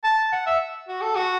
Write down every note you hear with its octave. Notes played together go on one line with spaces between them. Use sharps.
A5
F#5
E5
F#4
A4
F#4